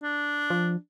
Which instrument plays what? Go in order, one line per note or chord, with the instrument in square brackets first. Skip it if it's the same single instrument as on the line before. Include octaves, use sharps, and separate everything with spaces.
[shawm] D4
[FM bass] F3